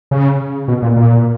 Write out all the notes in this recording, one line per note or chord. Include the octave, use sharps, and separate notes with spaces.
C#3
B2
A#2
A#2